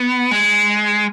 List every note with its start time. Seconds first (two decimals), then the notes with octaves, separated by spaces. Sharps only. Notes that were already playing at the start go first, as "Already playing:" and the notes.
Already playing: B3
0.31 G#3